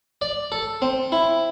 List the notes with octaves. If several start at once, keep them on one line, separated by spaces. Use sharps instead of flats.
D5
A4
C4
E4